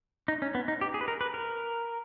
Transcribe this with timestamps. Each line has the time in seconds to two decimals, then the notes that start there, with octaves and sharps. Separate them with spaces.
0.28 D#4
0.42 C#4
0.55 B3
0.68 D#4
0.81 G4
0.94 G#4
1.01 B4
1.08 A#4
1.21 B4
1.34 A#4